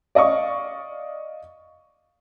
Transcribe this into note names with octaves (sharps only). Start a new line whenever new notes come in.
D5 D#5 F5 C#6